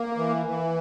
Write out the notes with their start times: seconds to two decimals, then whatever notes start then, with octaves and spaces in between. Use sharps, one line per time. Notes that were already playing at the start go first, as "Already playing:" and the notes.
Already playing: A#3
0.17 E3
0.46 E3